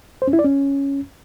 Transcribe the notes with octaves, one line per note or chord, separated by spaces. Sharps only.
C5
C#4
E4
D5
C#4